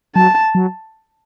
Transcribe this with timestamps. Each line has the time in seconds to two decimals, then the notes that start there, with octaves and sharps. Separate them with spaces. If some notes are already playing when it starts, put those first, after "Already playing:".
0.16 F#3 A5
0.55 F#3